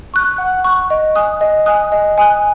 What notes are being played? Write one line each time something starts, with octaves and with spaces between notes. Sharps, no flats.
C#6 F#6
F#5
C#6 F#6
D#5
G#5 D#6 F#6
D#5
G#5 D#6 F#6
D#5
G#5 D#6 F#6